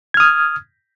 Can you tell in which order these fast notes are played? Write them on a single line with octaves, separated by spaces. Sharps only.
G#6 F6 D#6